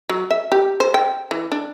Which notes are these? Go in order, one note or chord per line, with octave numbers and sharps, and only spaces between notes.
F#3
E5
G4
C5
G5
E3
D4